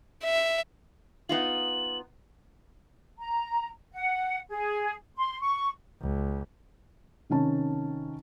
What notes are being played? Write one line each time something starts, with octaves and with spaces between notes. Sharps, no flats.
E5
B3 D#4 F4 F#7
A#5
F#5
G#4
C6
C#6
C#2
C3 D#3 C#4 A5